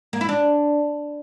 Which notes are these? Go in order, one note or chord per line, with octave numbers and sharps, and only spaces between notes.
A#3
E4
D4